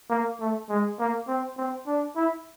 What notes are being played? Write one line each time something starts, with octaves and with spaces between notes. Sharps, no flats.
A#3
A3
G#3
A#3
C4
C4
D4
E4